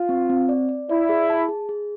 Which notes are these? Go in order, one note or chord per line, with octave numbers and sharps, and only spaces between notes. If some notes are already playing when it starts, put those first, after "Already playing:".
Already playing: F4
C4
C4
D5
D5
E4 D5
G#4
A5
G#4
G#4